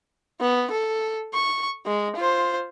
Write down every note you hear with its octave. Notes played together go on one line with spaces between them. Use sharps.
B3
A4
C#6
G#3
F4 C5